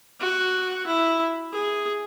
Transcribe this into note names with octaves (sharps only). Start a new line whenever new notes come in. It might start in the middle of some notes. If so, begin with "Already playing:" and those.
F#4
E4
G#4